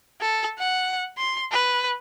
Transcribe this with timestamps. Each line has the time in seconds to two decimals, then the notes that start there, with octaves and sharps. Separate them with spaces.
0.21 A4
0.59 F#5
1.18 C6
1.52 B4